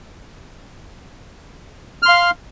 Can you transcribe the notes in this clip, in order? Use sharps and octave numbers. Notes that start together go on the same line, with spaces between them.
F5 C6 F6